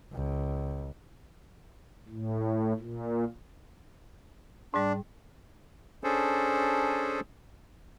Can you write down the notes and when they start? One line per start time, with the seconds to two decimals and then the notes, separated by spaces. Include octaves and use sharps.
0.13 C#2
2.09 A2
2.79 A#2
4.74 G#2 G3 D4
6.04 C#4 D4 G#4 A4 C5